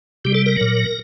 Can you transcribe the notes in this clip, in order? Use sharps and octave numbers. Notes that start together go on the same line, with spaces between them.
C3 G3 G4
A4
A#4
A#2 F#3